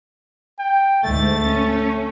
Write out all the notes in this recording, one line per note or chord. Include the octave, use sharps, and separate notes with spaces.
G5
D2 G#2 A3 A6
C#4